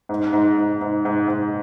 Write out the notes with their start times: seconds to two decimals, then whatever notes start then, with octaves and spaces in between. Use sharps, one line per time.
0.09 G#2
0.33 G#2
0.58 G#2
0.81 G#2
1.05 G#2
1.28 G#2